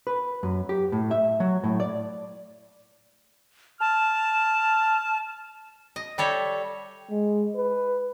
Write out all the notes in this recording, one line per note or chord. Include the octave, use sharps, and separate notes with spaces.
B4
F#2
G4
A2
E5
F#3
A2
D5
A5 F6
D#5
G3 A4 C#5 E5
G#3
B4